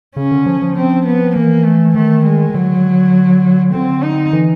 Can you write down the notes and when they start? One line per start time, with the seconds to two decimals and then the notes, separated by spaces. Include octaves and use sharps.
0.16 C#3 C#4
0.31 D3
0.46 F3
0.62 F3
0.76 C4
1.06 B3
1.36 E3 A#3
1.65 A3
1.95 D#3 A3
2.26 G#3
2.50 D#3
2.55 D3 F#3
3.73 D3 C4
4.03 D#4
4.33 E3